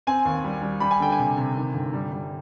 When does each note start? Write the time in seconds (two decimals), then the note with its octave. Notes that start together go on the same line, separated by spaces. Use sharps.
0.07 C4 G#5
0.25 D#2
0.44 G3
0.62 G3
0.80 G3 B5
0.91 G#5
1.00 D3 G5
1.12 G#5
1.19 C3
1.37 C3
1.56 D#3
1.74 G1
1.93 G3
2.12 G3